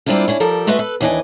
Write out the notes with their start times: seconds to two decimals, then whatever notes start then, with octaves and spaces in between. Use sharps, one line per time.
0.06 G3 A#3 C4 D4 E4 F4
0.28 C#4 D4 E4
0.40 F3 G3 A4 A#4
0.67 G#3 A3 F#4 B4 D#5 E5
0.79 A4 B4
1.00 D#2 E3 D4 A#4 D#5 G#5